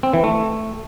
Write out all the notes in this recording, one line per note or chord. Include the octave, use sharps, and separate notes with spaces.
C4
E3
A3